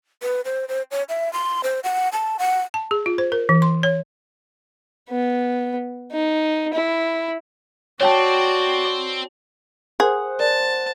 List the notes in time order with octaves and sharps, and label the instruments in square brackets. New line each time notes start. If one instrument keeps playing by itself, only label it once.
[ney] B4
C5
C5
C#5
E5
C6
C5
F#5
A5
F#5
[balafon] A5
G#4
F4
C5
A#4
E3
C6
C#5
[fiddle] B3
D#4
E4
[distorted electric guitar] C4 [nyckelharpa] F#4 D5 [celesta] C#5 G5 A5
[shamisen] G#4 [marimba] A#4 [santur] C5 F#5
[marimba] A#4 D5 [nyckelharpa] A5